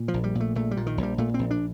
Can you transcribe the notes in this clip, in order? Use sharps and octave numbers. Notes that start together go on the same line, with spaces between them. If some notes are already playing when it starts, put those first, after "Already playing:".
Already playing: A#2
F3
A#1
G3
A#2
A3
A#1 A3
G3
A#2
D#3
A#1
G3
A#2 A3
A#1 C4
D4